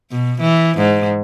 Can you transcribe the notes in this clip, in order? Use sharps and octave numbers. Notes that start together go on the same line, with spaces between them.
B2
E3
G#2